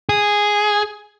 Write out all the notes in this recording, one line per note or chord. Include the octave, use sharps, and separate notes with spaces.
G#4